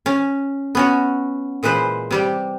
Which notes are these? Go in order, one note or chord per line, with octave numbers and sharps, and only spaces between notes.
C#4
B3 C#4 F#4
A#2 E3 G#3 B4 C5
C3 G3 G4